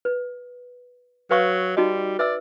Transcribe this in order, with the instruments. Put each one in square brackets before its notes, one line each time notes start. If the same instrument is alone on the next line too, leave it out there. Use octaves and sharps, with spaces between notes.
[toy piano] B4
[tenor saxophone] F#3 [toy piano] B4 F5 C#6
[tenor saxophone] G3 [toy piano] D#4 F#4 D#5
[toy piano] B4 E5 E6 [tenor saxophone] D5